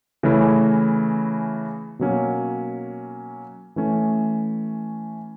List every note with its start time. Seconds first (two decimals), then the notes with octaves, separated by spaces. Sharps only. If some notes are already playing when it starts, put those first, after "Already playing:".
0.23 C#3 E3 A3 C#4 E4
1.99 B2 F#3 A#3 C#4
3.76 E3 A3 C#4